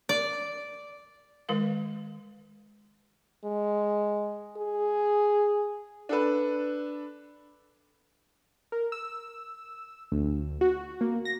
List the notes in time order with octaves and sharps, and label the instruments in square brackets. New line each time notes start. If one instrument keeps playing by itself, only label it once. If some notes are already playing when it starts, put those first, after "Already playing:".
[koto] D5
[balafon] D#3 G#3 A#4 F5
[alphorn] G#3
G#4
[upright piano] D4 A4 B4
[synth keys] A#4
E6
D2
F#4
A#3
A#6